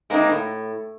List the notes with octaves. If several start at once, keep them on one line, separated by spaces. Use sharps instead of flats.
G#3 A#3 C4 D4 D#4
A2